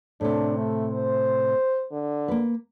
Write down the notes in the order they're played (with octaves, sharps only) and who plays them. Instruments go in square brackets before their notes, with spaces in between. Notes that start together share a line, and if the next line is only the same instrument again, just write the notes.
[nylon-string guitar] A2 C3 [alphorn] D4
[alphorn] A3
C5
D3
[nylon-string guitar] A#3 B4